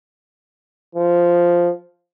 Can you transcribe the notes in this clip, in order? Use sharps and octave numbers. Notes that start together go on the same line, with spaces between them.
F3